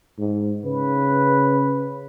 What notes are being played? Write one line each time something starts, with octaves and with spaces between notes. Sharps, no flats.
G#2
C#3 B4